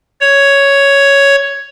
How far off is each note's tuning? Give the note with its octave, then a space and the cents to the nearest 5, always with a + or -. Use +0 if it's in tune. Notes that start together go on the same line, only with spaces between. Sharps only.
C#5 +5